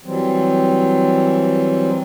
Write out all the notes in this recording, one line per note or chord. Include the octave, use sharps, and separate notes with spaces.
E3 F#3 G3 C4